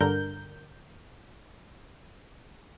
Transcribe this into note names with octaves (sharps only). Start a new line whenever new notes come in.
G2 D3 A#4 G6